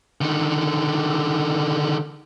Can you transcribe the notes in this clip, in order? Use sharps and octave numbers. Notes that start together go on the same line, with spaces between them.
D3 D#3